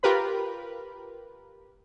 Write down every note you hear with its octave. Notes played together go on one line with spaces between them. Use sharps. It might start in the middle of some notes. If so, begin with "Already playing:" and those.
F4 G4 A#4 B4 B5